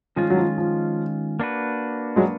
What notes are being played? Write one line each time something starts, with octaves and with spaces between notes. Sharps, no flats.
D#3 F3 G#3 C#4 F4
F#3
F3
F3
A#3 D4 F#4 B4
F#3 G#3